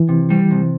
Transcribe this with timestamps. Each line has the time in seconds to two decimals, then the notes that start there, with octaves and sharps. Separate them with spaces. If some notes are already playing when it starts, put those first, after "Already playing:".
Already playing: E3
0.09 C3
0.30 G3
0.51 C3